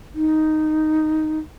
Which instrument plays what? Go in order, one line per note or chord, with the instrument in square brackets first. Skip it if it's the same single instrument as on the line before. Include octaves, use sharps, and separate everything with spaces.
[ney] D#4